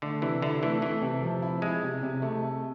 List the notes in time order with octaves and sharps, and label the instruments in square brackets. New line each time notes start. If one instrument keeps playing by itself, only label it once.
[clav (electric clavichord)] D3 [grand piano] A3
[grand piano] C3 [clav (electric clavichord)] E3
[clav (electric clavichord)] D3 [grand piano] E4
[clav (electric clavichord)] E3 [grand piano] A3
[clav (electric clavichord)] E3 [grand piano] A3
[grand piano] C3
F3
E4
[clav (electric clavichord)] G#3 [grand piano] E4
[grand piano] C3
C3
A3
A3